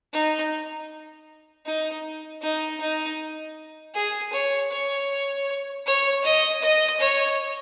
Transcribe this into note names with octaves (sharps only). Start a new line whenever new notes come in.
D#4
D#4
D#4
D#4
G#4
C#5
C#5
C#5
D#5
D#5
C#5